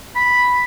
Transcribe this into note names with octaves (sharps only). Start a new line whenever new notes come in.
B5